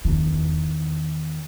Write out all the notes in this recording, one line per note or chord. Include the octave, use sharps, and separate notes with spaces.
E2 D#3